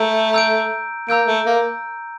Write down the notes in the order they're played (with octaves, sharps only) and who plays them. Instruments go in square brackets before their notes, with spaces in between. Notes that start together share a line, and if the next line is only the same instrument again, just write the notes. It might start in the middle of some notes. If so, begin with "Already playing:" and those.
Already playing: [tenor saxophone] A3 [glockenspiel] A#5 E6 G6 D7
[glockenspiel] A#5 E6 G6 D7
[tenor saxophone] A#3 [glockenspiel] A#5 E6 G6 D7
[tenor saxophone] A3
A#3